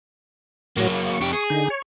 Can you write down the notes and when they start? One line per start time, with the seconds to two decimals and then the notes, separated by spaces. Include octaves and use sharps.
0.77 A2 F#3 A#3 F#4 C#5
0.94 C#6
1.21 F2 G4
1.33 G#4
1.50 D3 D#4
1.70 C#5